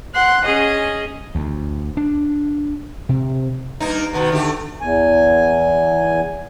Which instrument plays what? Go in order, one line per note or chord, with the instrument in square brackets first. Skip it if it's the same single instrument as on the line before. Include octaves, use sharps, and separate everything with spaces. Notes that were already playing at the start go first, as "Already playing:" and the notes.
[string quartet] F#5 C6 F#6
C#4 G#4 D#5
[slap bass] D2
D4
C3
[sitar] G2 A#3 D#4
B2 D#3 B3
D3 A3 G4
[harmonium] E2 G#5